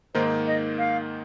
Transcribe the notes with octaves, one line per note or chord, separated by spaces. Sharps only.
G#2 D#3 A#3 D#4 C5
D#5
F5